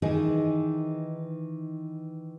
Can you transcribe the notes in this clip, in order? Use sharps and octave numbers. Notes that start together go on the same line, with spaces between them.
D#3 E3 D#4 G#4